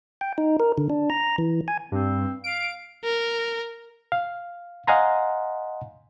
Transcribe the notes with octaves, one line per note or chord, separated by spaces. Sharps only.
G5
D#4
A#4
D3
D4
A#5
E3
G#5
G2 C4
F5 D7
A#4
F5
D#5 F5 F#5 G#5 A#5 C6